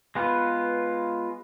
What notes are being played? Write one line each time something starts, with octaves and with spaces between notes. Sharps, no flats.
G#3 B3 F4 B4